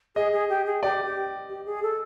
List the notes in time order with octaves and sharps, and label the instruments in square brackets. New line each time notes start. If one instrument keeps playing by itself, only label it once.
[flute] G#4 [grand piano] D#5
[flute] G#4
G4
G#4
[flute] G4 [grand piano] D5
[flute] G4
G4
G#4
A4